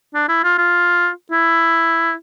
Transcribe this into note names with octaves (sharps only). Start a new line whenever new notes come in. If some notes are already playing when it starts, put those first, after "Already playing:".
D4
E4
F4
F4
E4